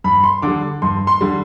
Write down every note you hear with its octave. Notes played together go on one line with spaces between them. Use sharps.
G2 B5
C6
D3 G3 D6
G2 C6
C6
D3 G3